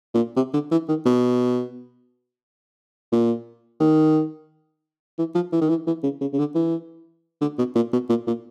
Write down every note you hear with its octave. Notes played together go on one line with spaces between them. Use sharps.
A#2
C3
D3
E3
D#3
B2
A#2
D#3
E3
F3
E3
D#3
E3
E3
C#3
C#3
C#3
D3
E3
D3
B2
A#2
B2
A#2
A#2